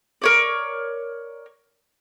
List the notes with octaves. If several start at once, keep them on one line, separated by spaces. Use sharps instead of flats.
A#4 C#5 D5